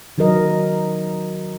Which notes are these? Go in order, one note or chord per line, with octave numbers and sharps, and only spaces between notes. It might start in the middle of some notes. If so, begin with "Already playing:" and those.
D#3 F#3 F#4 A#4 D#5